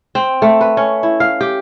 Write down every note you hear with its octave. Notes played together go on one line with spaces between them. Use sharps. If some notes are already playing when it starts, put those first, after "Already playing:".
C4
A3
B4
C#4
E4
F5
G4